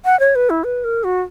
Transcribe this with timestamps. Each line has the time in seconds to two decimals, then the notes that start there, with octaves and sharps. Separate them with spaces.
0.05 F#5
0.20 C#5
0.35 B4
0.50 E4
0.64 B4
0.84 A#4
1.04 F#4